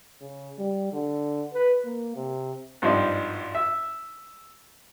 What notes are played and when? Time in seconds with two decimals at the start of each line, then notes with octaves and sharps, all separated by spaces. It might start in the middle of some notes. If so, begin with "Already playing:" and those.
0.22 C#3
0.59 G3
0.93 D3
1.54 B4
1.85 A#3
2.16 C3
2.82 G#1 G2 F3 C4 D#4 D5
3.55 E5